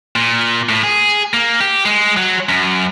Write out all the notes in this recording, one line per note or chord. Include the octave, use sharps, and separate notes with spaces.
A#2
A2
G#4
A#3
G4
G#3
F#3
F#2